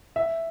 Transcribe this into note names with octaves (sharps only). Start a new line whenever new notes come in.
E5